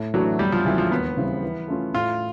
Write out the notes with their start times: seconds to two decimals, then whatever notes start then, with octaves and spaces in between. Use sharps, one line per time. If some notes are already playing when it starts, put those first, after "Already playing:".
Already playing: A2
0.14 E3 F#3 A3 D4 F#4
0.39 E2 G3
0.52 F3
0.65 C#3 E3 F#3 A3
0.78 F3
0.91 D#2 B3
1.17 C#3 E3 G3 C4
1.43 E3
1.68 A3 C#4 F4 A4
1.94 A2 F4